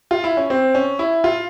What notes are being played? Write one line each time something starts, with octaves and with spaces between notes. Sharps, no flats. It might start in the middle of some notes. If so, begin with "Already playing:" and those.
F4
E4
C#4
C4
C#4
E4
F4